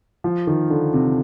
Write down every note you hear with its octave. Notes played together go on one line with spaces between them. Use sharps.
F3
D#3
D3
C3